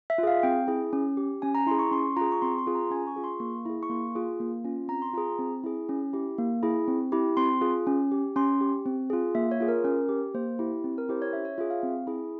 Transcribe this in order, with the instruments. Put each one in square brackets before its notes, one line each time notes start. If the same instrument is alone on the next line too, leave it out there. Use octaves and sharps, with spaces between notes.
[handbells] E5
F4
G#4 F5
C4 G5
E4 G#4
C#4
G4
C#4 G#5
A#5
E4 C6
G#4
C#6
C#4 C6
F4 A#5
G#4
C#6
C4 C6
C6
F4 G#4
A#5
C#4 G#5
C#6
F4 G#4
C6
A#3 C#6
E4 G#4
C#6
A#3 C6
F4 G#4
A#3
C#4 F4
C4 A#5
C6
F4 G#4 A#5
C4
E4 G#4
C#4
E4 G4
A#3
E4 G#4
C4
E4 G4
C4 C6
F4 G#4
C#4
G4
C#4 C6
G4
C4
F4 G#4
A#3 E5
C#5
F4 G#4
A#4
C#4 A#4
G4
A#3 C5
E4 G4
C4
A#4
E4 G4 C5
C#5
C#4 E5
C#5
F4 G#4 E5
F5
C4
E4 G#4